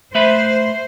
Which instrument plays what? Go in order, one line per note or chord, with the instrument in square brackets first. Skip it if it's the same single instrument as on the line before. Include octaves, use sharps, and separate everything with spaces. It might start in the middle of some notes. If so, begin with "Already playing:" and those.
[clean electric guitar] A3 B4 B5 [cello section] C5 [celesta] E5